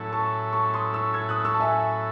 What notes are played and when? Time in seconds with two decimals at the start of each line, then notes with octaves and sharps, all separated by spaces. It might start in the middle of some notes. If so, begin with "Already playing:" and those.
Already playing: A2 F#3 C#4 E4 A4
0.12 A5 C#6
0.53 A5 C#6
0.73 C6 D#6
0.93 C#6 E6
1.14 E6 G#6
1.29 D#6 F#6
1.45 C#6 E6
1.53 A5
1.60 E5 G#5